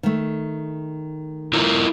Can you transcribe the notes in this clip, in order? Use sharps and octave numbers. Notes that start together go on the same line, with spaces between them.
D#3 A3
E4 F4 A#4